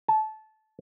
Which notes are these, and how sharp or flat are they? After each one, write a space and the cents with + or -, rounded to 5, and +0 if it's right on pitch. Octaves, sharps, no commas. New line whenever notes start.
A5 -20